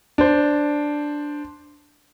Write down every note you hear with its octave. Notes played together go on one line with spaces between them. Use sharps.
D4 C5